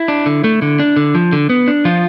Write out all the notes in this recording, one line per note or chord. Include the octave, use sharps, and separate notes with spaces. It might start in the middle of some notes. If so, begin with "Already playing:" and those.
Already playing: E4
D4
D3
A3
D3
D4
D3
F3
D3
B3
D4
F3 F4